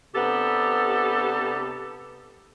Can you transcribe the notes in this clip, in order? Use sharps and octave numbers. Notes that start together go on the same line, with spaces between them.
C3 B3 D4 G4 A4